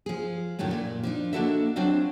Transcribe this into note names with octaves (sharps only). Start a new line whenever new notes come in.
F3 G#4
F#2 A2 D#3 F#3 A3
A#2
F3 D4 D#4
A#3 D4 F#4 A4 D#5 E5
F#3 C4 D4 F4 D#5